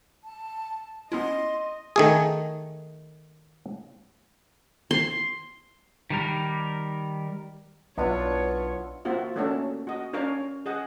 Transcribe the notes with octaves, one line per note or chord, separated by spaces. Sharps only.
A5
B3 C#4 E4 D#5 C6
D#3 A3 G#4
C6
D#3 G3 A#4
B1 B3 D4 E4 F4 C#5
A#3 C4 F4 F#4 E5
A3 A#3 C#4 D4 F#4 A4
F#4 D#5
C#4 D4 A#4 C#5 F5
G#4 D#5 F#5